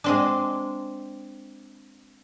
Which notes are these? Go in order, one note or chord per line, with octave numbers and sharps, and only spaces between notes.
G#3 C4 D4